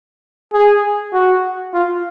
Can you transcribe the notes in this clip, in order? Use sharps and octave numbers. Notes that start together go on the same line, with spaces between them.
G#4
F#4
F4